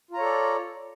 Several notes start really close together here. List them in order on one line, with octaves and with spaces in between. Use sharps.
F4 A#5 C#5 A4 D5